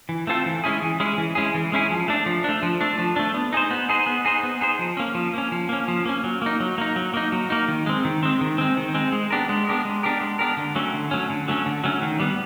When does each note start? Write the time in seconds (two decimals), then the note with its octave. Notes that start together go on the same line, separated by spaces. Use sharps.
0.09 E3
0.27 A3 C4 F4 A4
0.46 E3
0.64 G#3 C#4 E4 G#4
0.82 E3
1.00 G#3 C#4 E4 G#4
1.18 E3
1.35 G#3 C#4 E4 G#4
1.54 E3
1.72 G#3 C#4 E4 G#4
1.90 F3
2.08 A3 D4
2.26 F3
2.44 A3 D4
2.63 F3
2.81 A3 D4
2.99 F3
3.16 A3 D4
3.34 B3
3.53 D#4 G#4 C5
3.71 B3
3.89 D#4 G#4 C5
4.07 B3
4.25 D#4 G#4 C5
4.43 B3
4.61 D#4 G#4 C5
4.79 F3
4.97 A#3 C#4
5.15 F3
5.34 A#3 C#4
5.52 F3
5.69 A#3 C#4
5.88 F3
6.05 A#3 C#4
6.24 F#3
6.42 A#3 D#4
6.60 F#3
6.78 A#3 D#4
6.96 F#3
7.14 A#3 D#4
7.32 F#3
7.50 A#3 D#4
7.68 D#3
7.86 G#3 C4
8.05 D#3
8.23 G#3 C4
8.41 D#3
8.58 G#3 C4
8.77 D#3
8.94 G#3 C4
9.12 G#3
9.31 B3 D4 G4 A#4
9.49 G#3
9.67 B3 D4 G4 A#4
9.85 G#3
10.03 B3 D4 G4 A#4
10.21 G#3
10.39 B3 D4 G4 A#4
10.57 D3
10.75 F#3 A3 C#4
10.94 D3
11.11 F#3 A3 C#4
11.30 D3
11.48 F#3 A3 C#4
11.66 D3
11.84 F#3 A3 C#4
12.02 D#3
12.20 G3 B3